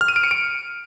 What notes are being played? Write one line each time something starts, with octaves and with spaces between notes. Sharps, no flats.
F6
D#7
D7
C#7
D7